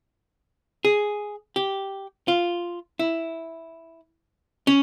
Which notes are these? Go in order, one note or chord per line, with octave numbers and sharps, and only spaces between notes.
G#4
G4
F4
E4
C#4